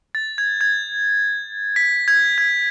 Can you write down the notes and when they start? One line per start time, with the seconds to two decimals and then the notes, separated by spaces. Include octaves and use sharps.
0.15 A6
0.38 G#6
0.61 G#6
1.76 B6
2.08 G#6
2.38 G#6